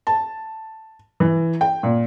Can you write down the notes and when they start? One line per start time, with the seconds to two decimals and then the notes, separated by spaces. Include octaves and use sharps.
0.07 A5
1.20 E3
1.61 G5
1.83 A#2